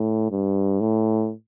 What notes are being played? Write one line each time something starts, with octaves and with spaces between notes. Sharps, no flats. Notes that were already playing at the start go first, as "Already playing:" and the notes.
Already playing: A2
G2
A2